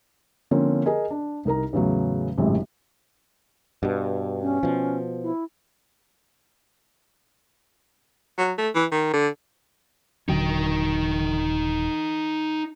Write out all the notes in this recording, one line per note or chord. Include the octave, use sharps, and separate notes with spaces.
D3 F3 A#3 C4 C#4
G#4 A#4 D#5 G#5
D4
C2 D#4 A#4 A#5
E2 A2 C#3 F#3
G#1 F#2 A2 C3 G#3
G2 B2
C#4
B2 F3
E4
F#3
A3
E3
D#3
D3
D#1 D3 F#3 D#4 G5